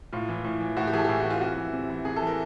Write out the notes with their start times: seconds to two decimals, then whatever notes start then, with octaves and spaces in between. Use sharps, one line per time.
0.12 A2 F4
0.29 E3
0.44 A2
0.61 E3
0.77 A2 F#4
0.87 G4
0.93 E3 G#4
0.98 A4
1.05 G4
1.09 A2 G#4
1.20 F#4
1.25 E3
1.30 F4
1.41 C3 F#4
1.57 E3
1.73 C3
1.90 E3
2.05 C3 G#4
2.16 A4
2.22 E3
2.27 A#4